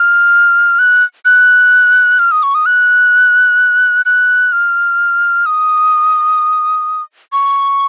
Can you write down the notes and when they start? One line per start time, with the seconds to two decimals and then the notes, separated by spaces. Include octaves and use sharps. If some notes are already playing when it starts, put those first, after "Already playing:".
Already playing: F6
0.79 F#6
1.25 F#6
2.19 F6
2.31 D#6
2.43 C#6
2.55 D#6
2.66 F#6
4.06 F#6
4.52 F6
5.46 D#6
7.33 C#6